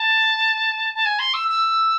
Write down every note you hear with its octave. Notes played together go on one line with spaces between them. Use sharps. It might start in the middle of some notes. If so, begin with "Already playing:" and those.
Already playing: A5
A5
G#5
C6
E6
E6